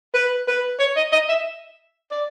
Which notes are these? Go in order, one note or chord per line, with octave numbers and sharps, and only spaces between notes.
B4
B4
C#5
D#5
D#5
E5
D5